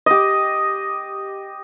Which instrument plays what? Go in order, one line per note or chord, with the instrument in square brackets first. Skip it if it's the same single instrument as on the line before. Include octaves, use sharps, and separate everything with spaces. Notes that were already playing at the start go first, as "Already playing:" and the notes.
[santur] G4 D#5